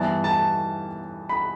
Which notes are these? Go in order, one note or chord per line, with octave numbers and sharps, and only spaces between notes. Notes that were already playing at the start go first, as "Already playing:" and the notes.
Already playing: G2 E3 B3 A5
A5
B5